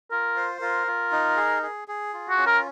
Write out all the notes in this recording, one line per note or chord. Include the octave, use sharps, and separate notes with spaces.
F4 A#4
C5
F4 A#4
F4
D#4
G#4
G#4
G#4
F4
F#4
C#4
A#4